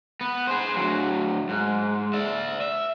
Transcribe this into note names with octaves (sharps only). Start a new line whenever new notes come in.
B3
G#4 C5
D2 F#3
G#2
D5 E5
E5